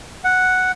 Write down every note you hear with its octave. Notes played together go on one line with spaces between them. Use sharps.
F#5